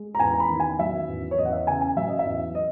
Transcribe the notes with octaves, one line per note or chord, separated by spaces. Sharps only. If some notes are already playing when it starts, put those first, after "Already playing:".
Already playing: G#3
A#5
E2 G#5
A#5
B5
D#3
G#5
F#3 E5
E2
C#5
E2 D#5
F#5
E5
C#3 G#5
G#5
F#3 E5
D#5
E5
E2
D#5